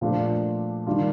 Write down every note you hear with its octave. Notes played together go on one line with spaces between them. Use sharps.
A#2 F3 A3 D4 F4
D#3 G3 D4 F4